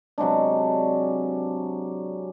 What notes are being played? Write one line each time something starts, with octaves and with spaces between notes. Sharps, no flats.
C3 F#3 G#3 D4